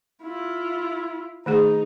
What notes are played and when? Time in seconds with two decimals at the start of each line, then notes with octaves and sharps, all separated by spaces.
0.23 E4 F4
1.46 D#3 A3 D#4 G#4